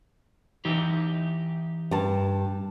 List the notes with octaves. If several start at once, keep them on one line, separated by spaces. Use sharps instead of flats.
E3 D#4 G4
G2 A5